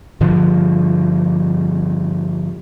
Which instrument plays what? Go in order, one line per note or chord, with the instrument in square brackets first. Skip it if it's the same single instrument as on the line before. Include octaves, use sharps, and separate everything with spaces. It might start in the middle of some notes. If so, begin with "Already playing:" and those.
[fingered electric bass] G2 D3 F3